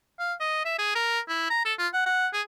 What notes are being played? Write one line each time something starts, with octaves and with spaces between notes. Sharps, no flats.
F5
D#5
E5
G#4
A#4
E4
A#5
A4
F4
F#5
F#5
G#4